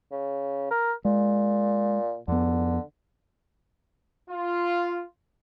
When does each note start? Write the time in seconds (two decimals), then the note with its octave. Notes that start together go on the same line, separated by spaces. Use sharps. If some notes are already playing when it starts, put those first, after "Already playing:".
0.11 C#3
0.71 A#4
1.05 A#2 G#3
2.28 F2 D3 B3
4.30 F4